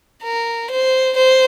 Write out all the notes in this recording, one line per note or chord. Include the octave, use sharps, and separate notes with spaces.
A#4
C5
C5